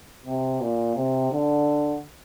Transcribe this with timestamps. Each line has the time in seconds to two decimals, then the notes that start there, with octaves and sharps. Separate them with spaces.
0.25 C3
0.60 A#2
0.96 C3
1.32 D3